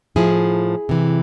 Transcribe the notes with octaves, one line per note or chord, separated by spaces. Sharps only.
A2 F3 E4 G#4
C3 E3